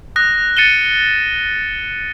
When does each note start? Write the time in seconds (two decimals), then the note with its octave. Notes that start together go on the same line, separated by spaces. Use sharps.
0.16 D#6 F#6 A#6
0.57 A6 C#7 D#7 E7 G7